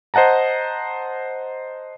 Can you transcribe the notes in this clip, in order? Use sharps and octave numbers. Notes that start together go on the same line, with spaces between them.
C5 D#5 F#5 A5 A#5